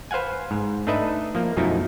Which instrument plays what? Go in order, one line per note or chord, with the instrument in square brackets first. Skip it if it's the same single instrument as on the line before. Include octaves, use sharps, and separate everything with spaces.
[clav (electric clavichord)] B4 C5 F5 F#5 G#5
G#2
A3 D4 D#4 B4 D#5 E5
F3 A#3
F#2 B2 F3 A3 D#4 E4